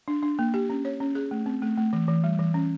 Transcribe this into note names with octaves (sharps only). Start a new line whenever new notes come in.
D4
D4
A#3
G4
C#4
C#5
C#4
G#4
A3
C4
A3
A3
E3
E3
G3
E3
C#4